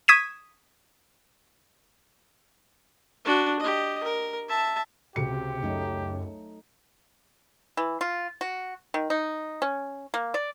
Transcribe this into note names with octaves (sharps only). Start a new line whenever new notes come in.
C#6 D#6 G#6 B6 D#7 E7
D4 F#4
G4 D#5
A#4
E5 A5
C#2 C3 F#4 G4 C#7
F#2 F#3 A3 D#4
E3
F4
F#4
D#3
D#4
C#4
A#3
D5